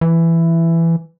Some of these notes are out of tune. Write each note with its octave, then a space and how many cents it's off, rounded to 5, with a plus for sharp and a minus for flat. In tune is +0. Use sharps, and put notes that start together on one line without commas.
E3 +10